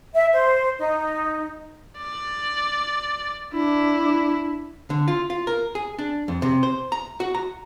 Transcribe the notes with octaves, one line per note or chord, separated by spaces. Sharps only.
E5
C5
D#4
D5
D4 E4
D3
F4
F4
A#4
G#4
D4
F2
C3
C5
A#5
F#4
A#5